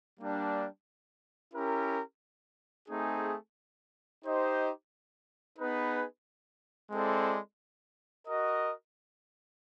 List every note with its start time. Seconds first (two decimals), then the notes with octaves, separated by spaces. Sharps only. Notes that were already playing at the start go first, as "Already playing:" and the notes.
0.20 G3 A#3 D4
1.54 C#4 E4 G4 A#4
2.88 A3 C4 D#4 G#4
4.23 D#4 G4 C5 D#5
5.57 B3 D#4 G#4 B4
6.91 G#3 C4 E4 A4 D5
8.25 F#4 A#4 D#5